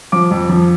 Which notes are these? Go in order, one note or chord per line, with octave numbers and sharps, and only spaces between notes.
F3 D6
F2
F3